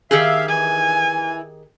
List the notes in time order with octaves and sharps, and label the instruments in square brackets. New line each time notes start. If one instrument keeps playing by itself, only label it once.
[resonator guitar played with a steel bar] D#3 G4 G#4 [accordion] E5 F5
[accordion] E3 [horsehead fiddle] G#5